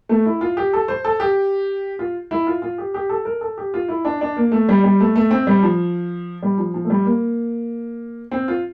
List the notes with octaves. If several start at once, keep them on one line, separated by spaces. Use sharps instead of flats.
A3
E4
F4
G4
A4
C5
A4
G4
F4
E4
F4
F4
G4
G4
A4
A#4
A4
G4
F4
E4
D4
D4
A#3
A3
G3
G3
A3
A3
C4
G3
F3
G3
F3
F3
A3
G3
A#3
C4
F4